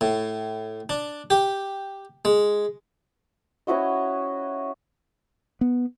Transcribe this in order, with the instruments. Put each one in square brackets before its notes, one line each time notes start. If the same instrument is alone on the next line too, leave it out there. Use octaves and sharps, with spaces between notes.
[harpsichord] A2
D4
G4
G#3
[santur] C#4 E4 F#4 D#5
[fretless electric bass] B3